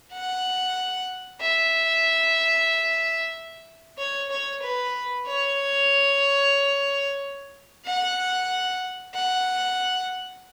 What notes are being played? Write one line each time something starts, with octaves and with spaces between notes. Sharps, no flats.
F#5
E5
C#5
C#5
B4
C#5
F#5
F#5